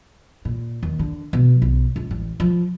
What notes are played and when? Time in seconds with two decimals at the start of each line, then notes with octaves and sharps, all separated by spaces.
0.45 A#2
0.83 D#2
0.99 D3
1.33 B2
1.62 B1
1.96 C#2
2.11 A1
2.40 F3